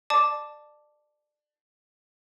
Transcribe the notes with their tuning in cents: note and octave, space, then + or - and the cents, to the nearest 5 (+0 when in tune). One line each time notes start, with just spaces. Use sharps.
D5 +25 A5 +0 D6 +0